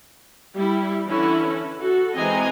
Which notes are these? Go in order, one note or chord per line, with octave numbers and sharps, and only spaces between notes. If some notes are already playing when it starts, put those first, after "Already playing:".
G3 E4
D3 E3 C#4 E4
F#4 A4
E3 G#3 C4 D#5 G#5 A#5